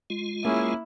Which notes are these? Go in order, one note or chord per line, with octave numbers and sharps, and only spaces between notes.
G#3 F4
A#3 C#4 E4 G#4